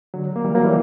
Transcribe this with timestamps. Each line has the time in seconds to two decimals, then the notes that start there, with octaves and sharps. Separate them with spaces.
0.14 D3 F#3
0.36 A#3
0.44 E3 G3
0.55 F#3 A#3
0.65 E3 G3